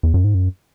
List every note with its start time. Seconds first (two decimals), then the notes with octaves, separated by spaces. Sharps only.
0.03 E2
0.14 F#2
0.24 G#2
0.35 F#2